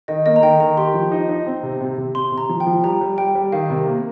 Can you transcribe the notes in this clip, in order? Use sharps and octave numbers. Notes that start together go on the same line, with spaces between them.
D#3 D#5
A#3 D#5
A#5
D#3 G5
D#3 A#5
G4 C6
F3
D#4
D#4
C4
C3
C3
C3
C3 C6
C3
A#5
F3
G5
F3
G3 A#5
G3
G3 G5
G3
D#3 F5
C3
A#3